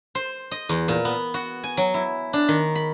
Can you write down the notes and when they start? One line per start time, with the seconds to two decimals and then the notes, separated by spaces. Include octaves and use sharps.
0.15 C5
0.51 D#5
0.69 E2
0.88 A#2
1.05 B3
1.34 F#4
1.64 G#5
1.77 F#3
1.94 E4
2.33 D4
2.48 D#3
2.75 B5